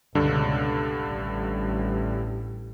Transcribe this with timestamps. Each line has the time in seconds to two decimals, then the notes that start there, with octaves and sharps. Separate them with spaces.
0.15 C#2 G2 B2 D3
1.03 A1 G3